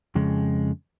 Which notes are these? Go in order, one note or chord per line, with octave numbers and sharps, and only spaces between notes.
F2 C#3 G#3